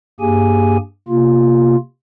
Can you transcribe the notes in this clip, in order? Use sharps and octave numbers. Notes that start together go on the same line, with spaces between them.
G2 A#3 G4 G#4 G#5
C3 A#3 F4